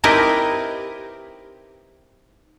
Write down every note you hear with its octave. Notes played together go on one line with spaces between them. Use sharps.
C4 D#4 E4 G4 A#4 B4